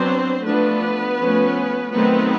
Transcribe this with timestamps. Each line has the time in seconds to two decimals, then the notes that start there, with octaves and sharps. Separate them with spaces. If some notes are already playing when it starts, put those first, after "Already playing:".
Already playing: F#3 B3 C4 D4 C5
0.44 F3 A3 B3 D4 B4
1.20 F3 A3 C#4
1.93 D#3 F#3 A3 B3 C4 B4